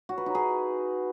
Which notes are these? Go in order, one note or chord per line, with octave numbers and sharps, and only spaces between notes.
F#4
B4
D#4
G#4